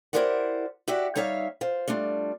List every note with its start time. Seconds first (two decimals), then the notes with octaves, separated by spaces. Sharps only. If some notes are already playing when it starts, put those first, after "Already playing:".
0.13 E4 G4 A#4 C5 D5 F#5
0.88 E4 F#4 G4 D5 E5 F#5
1.15 G3 D#4 C#5 E5 F5
1.61 F4 C5
1.88 G3 A3 D4 F4